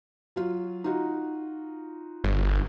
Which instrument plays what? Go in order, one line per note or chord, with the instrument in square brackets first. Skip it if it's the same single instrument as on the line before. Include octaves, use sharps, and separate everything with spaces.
[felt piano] F#3 F4
D#4 F4 F#4
[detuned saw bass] G1